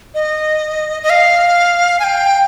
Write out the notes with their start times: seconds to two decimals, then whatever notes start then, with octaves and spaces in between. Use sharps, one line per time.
0.15 D#5
1.03 D#5
1.10 F5
2.00 G#5
2.04 G5